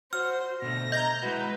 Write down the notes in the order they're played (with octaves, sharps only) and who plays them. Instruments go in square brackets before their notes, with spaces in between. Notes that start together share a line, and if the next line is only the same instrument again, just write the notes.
[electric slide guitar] F#4 [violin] C5 [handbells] F6
[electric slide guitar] B2 D3 A3 [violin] A#6
[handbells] D#5 [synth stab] A#5 G6
[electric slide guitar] G#3 E4 F#4 [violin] B4